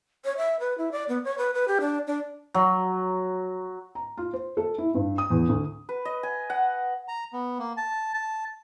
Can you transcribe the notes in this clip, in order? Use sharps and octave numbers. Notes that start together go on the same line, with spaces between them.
C#5
E5
B4
E4
D5
B3
C#5
B4
B4
G4
D4
D4
F#3
A#5
F4
C5
A4
E4
G2
D#6
E2
D2
B4
D#5
G#5
F#5
A#5
B3
A#3
A5
A5